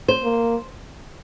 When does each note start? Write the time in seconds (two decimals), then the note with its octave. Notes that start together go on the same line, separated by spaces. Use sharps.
0.08 C5
0.24 A#3